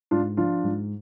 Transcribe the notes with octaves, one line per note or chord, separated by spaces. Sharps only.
G#2 D4 F4
F3 D4 F4
G#2